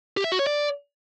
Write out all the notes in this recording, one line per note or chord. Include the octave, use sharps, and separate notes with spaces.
G4
E5
F#4
C#5
D5